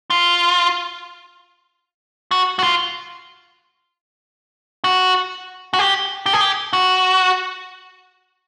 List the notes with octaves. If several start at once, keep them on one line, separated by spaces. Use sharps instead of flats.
F4
F#4
F#4
F4
F#4
F#4
G4
G4
G#4
G4
F#4